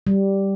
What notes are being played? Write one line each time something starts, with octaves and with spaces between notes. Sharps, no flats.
G3